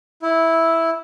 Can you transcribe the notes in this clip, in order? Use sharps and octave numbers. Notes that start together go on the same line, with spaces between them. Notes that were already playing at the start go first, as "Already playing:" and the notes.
E4